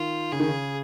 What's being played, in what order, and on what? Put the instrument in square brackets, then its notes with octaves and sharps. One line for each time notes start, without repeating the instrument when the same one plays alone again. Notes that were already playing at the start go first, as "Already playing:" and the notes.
Already playing: [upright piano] D#3 [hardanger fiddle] F4
[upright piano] C#3 [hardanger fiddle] G#4
[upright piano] D#3
C#3